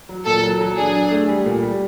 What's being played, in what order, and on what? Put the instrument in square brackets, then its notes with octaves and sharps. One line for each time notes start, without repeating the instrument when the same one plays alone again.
[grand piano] F#3
[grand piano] A#2 [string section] A4
[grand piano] F#3
F#3
[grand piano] D4 [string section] G#4
[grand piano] D4
A3
G3
A#2
G3